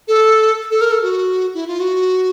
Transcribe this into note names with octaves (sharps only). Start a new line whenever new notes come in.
A4
A4
A#4
A4
F#4
E4
F4
F#4